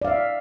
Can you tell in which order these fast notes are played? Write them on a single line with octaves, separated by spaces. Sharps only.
D5 F5 E5